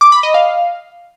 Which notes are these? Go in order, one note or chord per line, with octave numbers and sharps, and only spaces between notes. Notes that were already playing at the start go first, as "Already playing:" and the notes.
D6
B5
D#5
F5